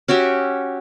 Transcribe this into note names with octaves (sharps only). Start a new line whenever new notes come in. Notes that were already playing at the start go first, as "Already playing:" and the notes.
C#4 F#4 G4 E5